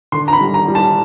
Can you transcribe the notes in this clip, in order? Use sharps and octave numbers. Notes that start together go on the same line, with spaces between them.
D3 C6
A#5
B5
G3
A#5
G3
A5